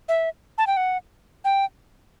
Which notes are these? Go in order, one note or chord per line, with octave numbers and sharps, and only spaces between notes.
E5
A5
G5
F#5
G5